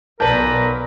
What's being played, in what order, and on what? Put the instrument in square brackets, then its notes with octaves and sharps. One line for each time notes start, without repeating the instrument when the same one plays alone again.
[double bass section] B1 [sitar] A#2 B4 [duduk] A#4 [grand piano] D5 A5 G6